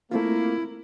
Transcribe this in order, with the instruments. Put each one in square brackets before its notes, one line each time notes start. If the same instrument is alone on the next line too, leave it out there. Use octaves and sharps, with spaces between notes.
[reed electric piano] A3 C4 F4 [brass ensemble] A#3 [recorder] E4